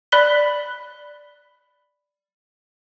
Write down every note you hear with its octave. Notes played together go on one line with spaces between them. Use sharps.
D5 B5 F#6 B6 G7